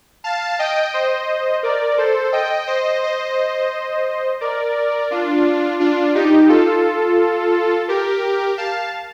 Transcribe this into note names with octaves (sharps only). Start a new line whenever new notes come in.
F5 A5
D#5 G5
C5 D#5
A#4 D5
A4 C5
D#5 G5
C5 D#5
C5 D#5
A#4 D5
D4 F4
D4 F4
D#4 G4
F4 A4
G4 A#4
F5 A5